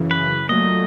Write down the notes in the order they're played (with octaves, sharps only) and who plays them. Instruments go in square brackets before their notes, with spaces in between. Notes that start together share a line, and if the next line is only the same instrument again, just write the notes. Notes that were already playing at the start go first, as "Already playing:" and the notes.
Already playing: [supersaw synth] F#2 C#3 E3
[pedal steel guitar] B4
[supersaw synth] A#2 F#3 A3 [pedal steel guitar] D#5